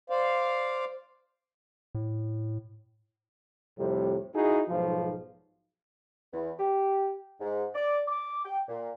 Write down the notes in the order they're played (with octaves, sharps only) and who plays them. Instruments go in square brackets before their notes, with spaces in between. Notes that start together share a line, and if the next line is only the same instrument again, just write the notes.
[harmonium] C5 D5 F5
[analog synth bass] A2
[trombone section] F2 A2 C3 G3
D#4 E4 F#4 G#4
B1 G#2 F3
[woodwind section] E2
G4
G#2
D5
D6
G5
A#2